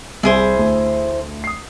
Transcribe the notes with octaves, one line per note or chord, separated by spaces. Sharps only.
C2 E4 G#4 C5
D2
D#6 C7